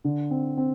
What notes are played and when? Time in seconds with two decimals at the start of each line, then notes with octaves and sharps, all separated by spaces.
0.04 D3
0.31 C4
0.57 C4